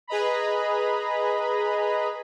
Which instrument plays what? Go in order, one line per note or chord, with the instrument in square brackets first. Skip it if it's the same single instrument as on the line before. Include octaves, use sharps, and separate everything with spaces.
[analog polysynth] G#4 B4 D#5 A#5 B5